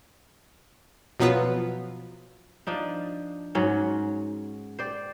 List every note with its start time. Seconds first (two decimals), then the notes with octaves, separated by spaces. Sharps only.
1.20 B2 F3 F#3 B3 F4 B4
2.67 F3 D4 D#4
3.55 G#2 F#3 C#4
4.79 C5 D5 G5